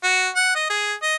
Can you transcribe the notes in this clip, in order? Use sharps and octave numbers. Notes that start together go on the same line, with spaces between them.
F#4
F#5
D#5
G#4
D#5